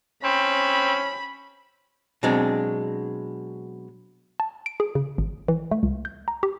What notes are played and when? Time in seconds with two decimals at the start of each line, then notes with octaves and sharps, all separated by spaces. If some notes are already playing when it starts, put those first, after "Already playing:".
0.24 C4 C#4 B5
2.23 B2 F#3 G#3 C4 D4
4.40 A5
4.66 D7
4.80 G#4
4.95 C#3
5.18 G#1
5.48 E3
5.71 A3
5.83 C#2
6.05 G6
6.28 A#5
6.43 G4